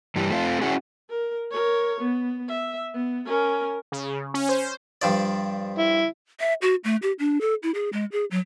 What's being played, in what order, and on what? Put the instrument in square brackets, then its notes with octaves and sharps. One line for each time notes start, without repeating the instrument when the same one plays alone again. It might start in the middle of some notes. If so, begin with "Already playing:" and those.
[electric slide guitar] G2 E3 G3
A3 C4 F4
C#4 E4 F#4 G#4
[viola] A#4
A#4 C#5
B3
E5
B3
C#4 A#4
[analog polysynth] C#3
C#4
C5
[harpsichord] G2 F3 D5
[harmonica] E4
[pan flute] E5
F#4
A3
G4
D4
A4
E4
G#4
G#3
G#4
F#3